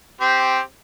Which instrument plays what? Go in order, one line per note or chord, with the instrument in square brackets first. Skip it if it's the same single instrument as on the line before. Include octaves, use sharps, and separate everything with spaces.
[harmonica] C4 G4